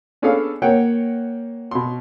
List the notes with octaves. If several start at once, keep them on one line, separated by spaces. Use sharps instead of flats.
B3 C#4 D4 G#4 A4 F5
A#3 C#5 F#5 G5
B2 C6